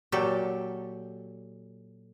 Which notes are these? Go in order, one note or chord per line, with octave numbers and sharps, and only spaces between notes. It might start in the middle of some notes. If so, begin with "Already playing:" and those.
A#2 F#3 G4 A4